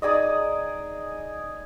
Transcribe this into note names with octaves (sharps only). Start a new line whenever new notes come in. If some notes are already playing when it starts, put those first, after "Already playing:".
D#4 G#4 D5 D#5